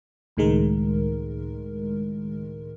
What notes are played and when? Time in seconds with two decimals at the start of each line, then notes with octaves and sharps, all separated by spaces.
0.37 C#2 A2 D#3 G#3 A#4